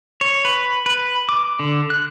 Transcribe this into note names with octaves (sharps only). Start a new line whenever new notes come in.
C#5
B4
B4
D6
D3
F#6